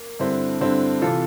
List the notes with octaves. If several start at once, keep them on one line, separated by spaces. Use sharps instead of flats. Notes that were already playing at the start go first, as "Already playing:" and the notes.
Already playing: A#3
G2 D3 C4 E4
G2 D3 C4 E4
C3 E3 F4 A4